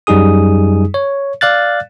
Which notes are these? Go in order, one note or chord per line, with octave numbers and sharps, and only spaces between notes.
F#2 G3 D#4 G#4 D#6
C#5
D5 F5 F#6 A6